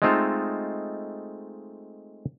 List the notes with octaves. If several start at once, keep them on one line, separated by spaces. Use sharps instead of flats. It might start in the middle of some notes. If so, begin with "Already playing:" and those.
G#3 A3 C4 D#4 F4 A4